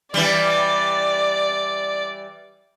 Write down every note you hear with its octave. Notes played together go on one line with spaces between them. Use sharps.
E3 G3 D5